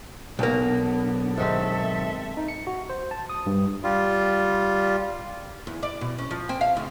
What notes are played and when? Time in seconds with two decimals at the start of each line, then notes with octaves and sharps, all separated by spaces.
0.39 B1 A#3 B3 D4
1.38 G#2 D#3 C4 A4 E5
2.37 D#4
2.48 C#7
2.67 F#4
2.89 C5
3.11 A5
3.29 D#6
3.46 G2
3.83 G3 F4
5.67 E2
5.83 D5
6.01 B2
6.18 C#4
6.31 F3
6.49 C4
6.61 F5
6.77 D2